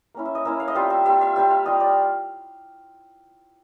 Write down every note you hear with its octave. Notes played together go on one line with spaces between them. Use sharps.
A#3 C#4 E4
E5
D#5
A#3 C#4 E4 E5
F5
D#5
G3 C4 F4 E5
E5
G3 C4 F4 E5
E5
G3 C4 F4 E5
F5
G3 C4 F4 D#5
D5